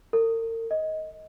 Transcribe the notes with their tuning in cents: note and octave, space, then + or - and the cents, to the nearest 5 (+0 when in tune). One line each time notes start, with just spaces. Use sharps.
A#4 -45
D#5 +15